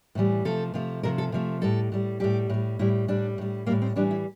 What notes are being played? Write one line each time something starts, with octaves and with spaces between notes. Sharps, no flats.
A2 E3 G3
C3 F3 A3 A4
C3 F3 A3
C3 F3 A3 A#4
A4
C3 F3 A3
A2 G3 A4
A2 G3
A2 G3 G4
A2 G3
A2 G3 E4
A2 G3 D4
A2 G3
A2 G3 A#3
C4
A2 E3 G3 D4
E4